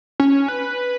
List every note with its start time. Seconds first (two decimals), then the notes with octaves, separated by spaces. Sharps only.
0.20 C#4
0.48 B4